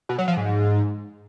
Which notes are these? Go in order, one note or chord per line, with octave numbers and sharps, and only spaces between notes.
B2
F#3
F3
G#2